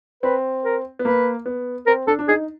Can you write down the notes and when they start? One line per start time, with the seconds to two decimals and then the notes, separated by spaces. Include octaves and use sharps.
0.23 C4 B4
0.64 A#4
0.99 B3
1.05 A#3 B4
1.46 B3
1.86 C4 A#4
2.07 D4 A4
2.19 D4
2.28 D#4 G#4